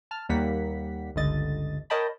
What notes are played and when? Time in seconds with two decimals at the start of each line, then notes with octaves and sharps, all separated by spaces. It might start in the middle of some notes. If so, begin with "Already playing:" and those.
0.11 A5 F6
0.29 D#2 G3 A#3 F#5 B6
1.16 G1 C#2 D3 D#5 A6
1.90 A#4 C#5 D#5 G5 A5 B5